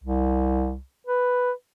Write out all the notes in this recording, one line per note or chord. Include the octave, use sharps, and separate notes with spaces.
C2
B4